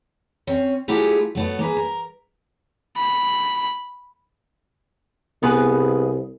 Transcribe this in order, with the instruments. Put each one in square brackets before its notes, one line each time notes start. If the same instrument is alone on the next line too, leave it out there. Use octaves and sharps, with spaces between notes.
[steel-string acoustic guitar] C4 C#4
F#3 A3 E4 F4 G4 G#4
F#3 A3 B3
A#3 G#4 B4
A#4
[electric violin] B5
[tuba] C2 [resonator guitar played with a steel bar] B3 G#4 B4